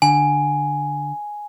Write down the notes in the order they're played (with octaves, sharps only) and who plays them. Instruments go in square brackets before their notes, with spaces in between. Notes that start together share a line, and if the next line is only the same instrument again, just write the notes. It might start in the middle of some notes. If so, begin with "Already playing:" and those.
[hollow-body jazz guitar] D3 [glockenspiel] G#5